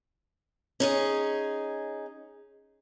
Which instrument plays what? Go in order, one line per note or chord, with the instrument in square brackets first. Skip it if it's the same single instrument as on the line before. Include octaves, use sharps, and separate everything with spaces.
[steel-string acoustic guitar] C#4 D#4 G#4